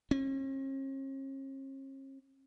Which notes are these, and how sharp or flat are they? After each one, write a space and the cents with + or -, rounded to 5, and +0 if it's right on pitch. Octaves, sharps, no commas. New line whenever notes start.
C#4 -45